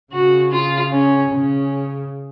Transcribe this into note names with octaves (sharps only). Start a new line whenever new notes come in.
C#3 F#4
F4
C#4
C#3 C#4